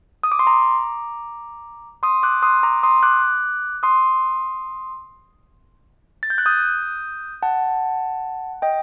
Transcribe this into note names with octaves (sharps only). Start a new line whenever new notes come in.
D#6
D6
C6
A#5 D6
C6 D#6
D6 F#6
C6 D#6
A#5 D6
C6 D#6
D6 F#6
C6 D#6
A6
G6
F#6
D#6 G6
F#5 A5
D#5 G5